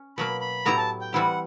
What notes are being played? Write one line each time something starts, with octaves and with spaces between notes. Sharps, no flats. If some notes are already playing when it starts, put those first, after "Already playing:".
Already playing: C#4
B2 F#3 A#3 B5
B5
A2 F#3 B3 E4 G4 A#5
A5
G5
E3 G3 C4 E4 G4 F#5